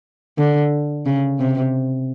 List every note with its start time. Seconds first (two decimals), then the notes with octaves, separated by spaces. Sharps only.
0.38 D3
1.06 C#3
1.39 C3